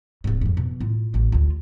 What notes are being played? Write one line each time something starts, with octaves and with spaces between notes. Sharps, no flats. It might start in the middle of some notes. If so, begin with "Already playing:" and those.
D1 G#2
F2 G#2
B2
A2 F4
A1 A3
D2 F4